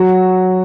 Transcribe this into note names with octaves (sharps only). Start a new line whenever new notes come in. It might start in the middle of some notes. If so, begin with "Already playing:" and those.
Already playing: F#3 F#4